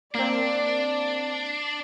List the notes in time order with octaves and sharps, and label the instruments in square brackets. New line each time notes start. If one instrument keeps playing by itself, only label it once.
[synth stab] A#3 C4 [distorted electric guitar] D4 [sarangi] D5